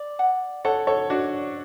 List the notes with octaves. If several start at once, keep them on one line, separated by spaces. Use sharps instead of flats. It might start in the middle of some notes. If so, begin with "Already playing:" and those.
Already playing: D5
F#5
A4 C#5 F#5
A4 C#5
D4 F#4 D5